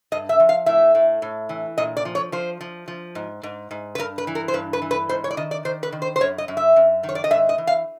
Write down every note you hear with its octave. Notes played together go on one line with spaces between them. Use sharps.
G2 D#5
E5
F3
F5
A2 E5
A2
A2
E3
A#2 D#5
D5
F3
C#5
F3 C5
F3
F3
G#2
G#2
G#2
B4
G2 A#4
B4
E3
A#4
C5
G2 B4
B4
E3
B4
G#2 C5
C#5
D5
D#3 D#5
D5
D#3 C5
B4
D#3
C5
C5
F#2 C#5
D#5
F#2
E5
F#2
D#3
C#5
D5
D#5
G#2 E5
D#5
E3
F5